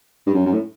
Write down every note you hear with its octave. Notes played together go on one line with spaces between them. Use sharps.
G2
F#2
F#2
A2